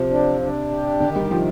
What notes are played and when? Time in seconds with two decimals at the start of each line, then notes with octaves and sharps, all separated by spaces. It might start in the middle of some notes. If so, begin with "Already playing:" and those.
Already playing: C3 F3
0.10 D4
0.41 D4
0.71 G4
1.00 D3 D#3
1.16 G3
1.30 C3 F3